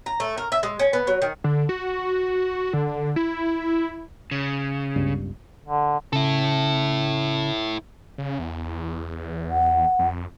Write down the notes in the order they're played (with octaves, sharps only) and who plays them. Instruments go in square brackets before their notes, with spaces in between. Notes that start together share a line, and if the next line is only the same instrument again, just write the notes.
[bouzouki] A#5
A3
A#4
E5
G#3
C#4
B3
F#3
D#3
[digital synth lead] D3
F#4
D3
E4
[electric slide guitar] C#3
[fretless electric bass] G1 C#2 G2
[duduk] D3
[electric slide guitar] C#3 [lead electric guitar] E4 A4
[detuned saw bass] C#3
E2
[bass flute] F#5
[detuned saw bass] F2